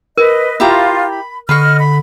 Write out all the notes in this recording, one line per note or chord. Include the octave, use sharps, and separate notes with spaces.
A#4 B4 D#5
E4 F4 G4 A#5
B5
D3 B4 D#5 C6 C#6 F6
B5